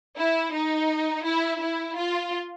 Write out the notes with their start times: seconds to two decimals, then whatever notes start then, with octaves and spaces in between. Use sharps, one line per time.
0.16 E4
0.52 D#4
1.23 E4
1.60 E4
1.96 F4